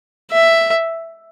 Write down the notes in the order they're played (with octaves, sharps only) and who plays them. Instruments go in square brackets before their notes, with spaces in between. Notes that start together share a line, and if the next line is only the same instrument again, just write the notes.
[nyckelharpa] E5